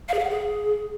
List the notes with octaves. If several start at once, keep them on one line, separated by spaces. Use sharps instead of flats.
F5
G#4
F5
F#5
G#4